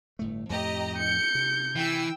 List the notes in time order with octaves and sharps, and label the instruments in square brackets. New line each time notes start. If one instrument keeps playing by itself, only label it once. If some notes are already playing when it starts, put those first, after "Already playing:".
[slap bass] G1 A2 A3
[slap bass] F2 A2 A3 [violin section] G4 D#5 A#5
[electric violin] G6 [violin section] C#7
[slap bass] C3
[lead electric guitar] E3 [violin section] G5 E6